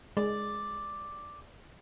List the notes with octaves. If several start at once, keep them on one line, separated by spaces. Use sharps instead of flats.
G#3 D5